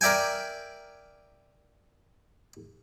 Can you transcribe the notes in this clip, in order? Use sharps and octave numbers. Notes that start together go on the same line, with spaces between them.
A#4 D5 E5 G5 G#5